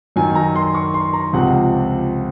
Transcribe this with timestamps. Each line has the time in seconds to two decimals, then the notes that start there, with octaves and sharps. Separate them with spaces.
0.16 F#2 D#3 F#3 G#5
0.35 A#5
0.55 C6
0.75 C#6
0.94 C6
1.13 A#5
1.33 C#2 C3 F3 C4 F#5